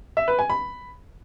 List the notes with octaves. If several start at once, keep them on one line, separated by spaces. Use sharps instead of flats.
E5
B4
G#5
B5